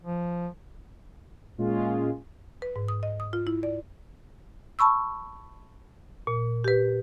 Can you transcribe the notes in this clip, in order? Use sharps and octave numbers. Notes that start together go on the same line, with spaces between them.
F3
A#2 G#3 C#4 F4 G#4
B4
G#2
D#6
D#5
D#6
F4
E4
D5
A5 B5 C#6 E6
A#2
G4 B4